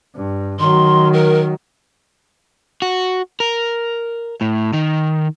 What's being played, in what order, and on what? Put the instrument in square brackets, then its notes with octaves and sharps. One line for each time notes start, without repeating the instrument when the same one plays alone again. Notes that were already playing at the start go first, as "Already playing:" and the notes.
[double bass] G2
[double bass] D#3 F#3 [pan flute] C6
[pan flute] A#4
[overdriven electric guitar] F#4
A#4
A2
D#3